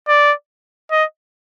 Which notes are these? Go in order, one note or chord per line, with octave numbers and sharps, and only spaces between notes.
D5
D#5